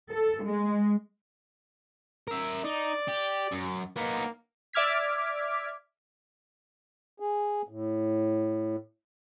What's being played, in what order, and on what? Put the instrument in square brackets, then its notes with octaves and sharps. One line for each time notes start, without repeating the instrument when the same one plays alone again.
[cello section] A4
G#3
[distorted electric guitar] A#4 E5
[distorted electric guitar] D#4 [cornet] D5
[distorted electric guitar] G4
F#2
[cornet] A#3 [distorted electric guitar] B3 D#4
[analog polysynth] D5 E5 D6 F6 G#6 B6
[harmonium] G#4
A2